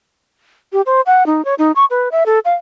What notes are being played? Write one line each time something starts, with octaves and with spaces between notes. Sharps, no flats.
G4
C5
F#5
D#4
C#5
D#4
C#6
B4
E5
A4
F5